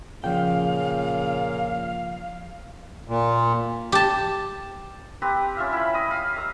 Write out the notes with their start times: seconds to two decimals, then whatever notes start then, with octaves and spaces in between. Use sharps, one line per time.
0.24 A#2 C#3 F3 F5 G5
3.08 A#2
3.92 G4 A5
5.22 C4 G4 B4 A#5
5.57 C#4 F4 E5 F5
5.73 E4 B5
5.94 D#5
6.11 F5 B5
6.36 A#5 E6